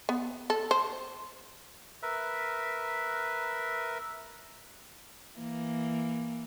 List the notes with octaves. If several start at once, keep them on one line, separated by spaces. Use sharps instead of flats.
B3
A4
C5
A#4 B4 E5
E3 A#3